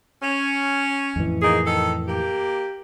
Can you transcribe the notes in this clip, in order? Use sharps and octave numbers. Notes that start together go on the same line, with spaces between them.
C#4
F2 A2 E3
A#3 D#4 G#4
D#3 A4
A#3 G4